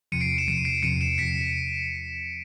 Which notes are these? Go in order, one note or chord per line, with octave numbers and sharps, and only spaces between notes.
E2 C3 F3 C#7 D#7
C7 D7
D7 E7
E2 C3 F3 C#7 D#7
D#7
C7 D7
E2 C3 F3 C#7 D#7
D7 E7
E2 C3 F3 B6 C#7